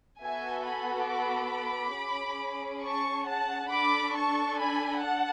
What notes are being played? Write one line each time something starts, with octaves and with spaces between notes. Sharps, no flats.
B3 F#4 A4 E5 G#5
G#5 B5
B5 D6
C#4 G#4
A5 C#6
F#5 A5
D4 A4 B5 D6
A5 C#6
G#5 B5
F#5 A5